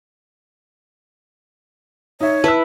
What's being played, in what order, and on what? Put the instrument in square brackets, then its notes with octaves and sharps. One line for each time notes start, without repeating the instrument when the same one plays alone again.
[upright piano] D#4 E5 [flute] C#5
[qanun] E4 B4 [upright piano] A5 E6